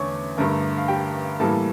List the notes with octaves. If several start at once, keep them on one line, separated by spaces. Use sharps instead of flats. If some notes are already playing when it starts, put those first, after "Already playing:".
Already playing: E2 D3 A3 C#5 C#6 D6
G2 D3 A3 A#4 A#5
F5
G4 G5
A2 E3 G3 A#3 A4 A5